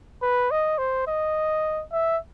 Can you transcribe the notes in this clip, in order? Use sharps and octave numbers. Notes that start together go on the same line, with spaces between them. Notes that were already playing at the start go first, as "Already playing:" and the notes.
B4
D#5
C5
D#5
E5